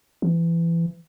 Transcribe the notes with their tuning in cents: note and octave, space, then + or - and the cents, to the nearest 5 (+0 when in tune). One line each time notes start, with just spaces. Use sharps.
E3 +25